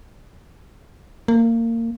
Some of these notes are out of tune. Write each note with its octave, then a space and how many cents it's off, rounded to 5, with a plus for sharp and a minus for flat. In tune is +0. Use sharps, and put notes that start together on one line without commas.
A#3 -25